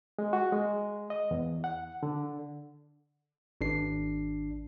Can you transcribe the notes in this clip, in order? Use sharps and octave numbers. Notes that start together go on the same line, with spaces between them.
G#3
F#4
G#3
D#5
E2
F#5
D3
G#1 D4 C7